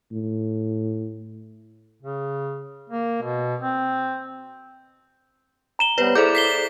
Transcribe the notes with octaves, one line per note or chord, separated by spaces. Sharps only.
A2
C#3
A#3
B2
C4
A#5 E7 G7
C3 G3 B3 B4 C#5
E4 G#4 A4 C5 D5 D6 G6
B6 C7 G7